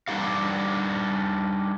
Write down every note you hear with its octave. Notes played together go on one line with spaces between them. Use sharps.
G3 D4 D#4 G4 F5